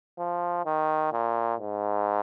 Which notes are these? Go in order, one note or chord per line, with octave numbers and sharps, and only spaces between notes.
F3
D#3
A#2
G#2